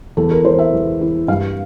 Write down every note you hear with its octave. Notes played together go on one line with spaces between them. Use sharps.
E2 A4
A#4
E3 C5
E5
E2
E3
G2 F5